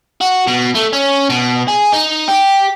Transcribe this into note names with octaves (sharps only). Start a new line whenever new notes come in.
F#4
B2
A3
C#4
B2
G#4
D#4
G4